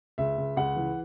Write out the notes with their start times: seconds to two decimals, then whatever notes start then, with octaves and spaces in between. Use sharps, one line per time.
0.18 C#2 E5
0.38 C#2
0.56 C#2 F#5
0.76 E3